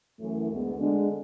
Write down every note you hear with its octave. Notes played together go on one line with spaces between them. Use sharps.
F#2 E3 A3
D2 D3 G#3 B3
D3 G#3 D4